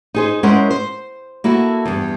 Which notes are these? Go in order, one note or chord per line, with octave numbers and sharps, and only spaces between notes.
D#4 G#4 C5
G#3 C#4 E4 A#4 C5 F#5
C5
A#3 E4 F#4 A4
E2 G2